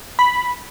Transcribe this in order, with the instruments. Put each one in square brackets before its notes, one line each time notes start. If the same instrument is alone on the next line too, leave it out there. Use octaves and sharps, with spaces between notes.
[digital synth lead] B5